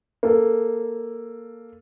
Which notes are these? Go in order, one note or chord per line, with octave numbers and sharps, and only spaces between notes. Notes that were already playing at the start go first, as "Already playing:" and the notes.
A#3 A4